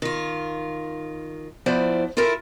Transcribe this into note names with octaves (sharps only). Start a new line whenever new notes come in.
D#3 F4
F3 B3 E4 C5 D5
E4 F4 A4 A#4 E5